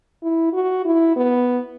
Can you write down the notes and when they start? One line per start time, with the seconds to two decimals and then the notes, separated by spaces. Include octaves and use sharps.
0.23 E4
0.53 F#4
0.85 E4
1.16 B3